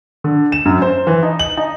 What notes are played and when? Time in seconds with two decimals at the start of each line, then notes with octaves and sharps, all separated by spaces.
0.24 D3
0.52 E7
0.65 F#2
0.82 C5
1.07 E3
1.23 D#4
1.39 F#7
1.57 D#4